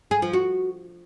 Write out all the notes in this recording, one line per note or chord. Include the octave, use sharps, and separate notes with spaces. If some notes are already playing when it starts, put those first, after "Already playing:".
G#4
F3
F#4